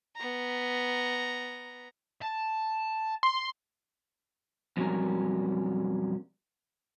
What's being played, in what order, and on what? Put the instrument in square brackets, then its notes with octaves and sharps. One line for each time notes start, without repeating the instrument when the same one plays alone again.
[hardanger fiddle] B3 A#5
[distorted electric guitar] A5
[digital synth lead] C6
[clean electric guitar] F2 B2 F#3 G3 C#4 A#4